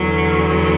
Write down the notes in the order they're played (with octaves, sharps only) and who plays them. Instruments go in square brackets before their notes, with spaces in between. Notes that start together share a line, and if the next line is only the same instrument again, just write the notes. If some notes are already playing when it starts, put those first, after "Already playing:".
Already playing: [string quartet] E2 D3 F#3